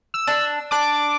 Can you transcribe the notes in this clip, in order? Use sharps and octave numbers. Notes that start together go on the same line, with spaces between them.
E6
D4
D4 D6